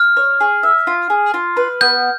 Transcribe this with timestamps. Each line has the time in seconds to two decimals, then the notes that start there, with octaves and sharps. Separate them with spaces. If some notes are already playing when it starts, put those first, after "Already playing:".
Already playing: F6
0.17 C#5
0.41 G#4
0.63 E5
0.87 F4
1.10 G#4
1.34 F4
1.57 B4
1.81 B3 G6